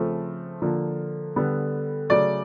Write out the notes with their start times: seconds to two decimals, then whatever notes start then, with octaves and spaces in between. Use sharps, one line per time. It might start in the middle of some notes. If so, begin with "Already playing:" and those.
Already playing: C#3 F3 A3 C4
0.62 D3 F3 A#3
1.36 D3 G3 B3
2.10 C#3 F#3 A3 D5